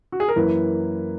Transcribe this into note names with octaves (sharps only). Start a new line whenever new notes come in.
F#4
G#4
A#4
F#2 E3 A#3 E4 B4